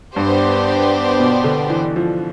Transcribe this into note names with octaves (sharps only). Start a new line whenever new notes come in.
G2 B3 D4 G4 C5
B2
D3
E3
F3